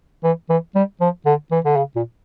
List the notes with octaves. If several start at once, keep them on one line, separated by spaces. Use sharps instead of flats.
E3
E3
G3
F3
D3
E3
D3
C#3
A#2